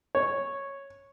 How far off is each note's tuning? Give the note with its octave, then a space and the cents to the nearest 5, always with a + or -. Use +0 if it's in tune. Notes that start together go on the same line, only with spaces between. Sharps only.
C#5 -5